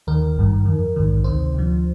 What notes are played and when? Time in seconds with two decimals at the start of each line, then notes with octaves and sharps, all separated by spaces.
0.07 D#2 D#3 A#4
0.36 G#1 G2 D#3
0.65 F2 D#3
0.96 A#1 G#2 D#3
1.24 D2 C3 D#3 C5
1.54 D2 D3 F3